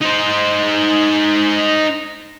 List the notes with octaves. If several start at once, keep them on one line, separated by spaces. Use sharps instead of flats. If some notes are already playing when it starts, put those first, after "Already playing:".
D#4 C5